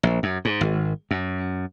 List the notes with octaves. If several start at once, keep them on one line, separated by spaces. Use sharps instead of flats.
A#1
F#2
G#2
G#1
F#2